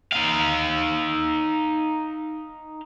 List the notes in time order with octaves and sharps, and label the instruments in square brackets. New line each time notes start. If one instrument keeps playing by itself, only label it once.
[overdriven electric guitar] D#4 F5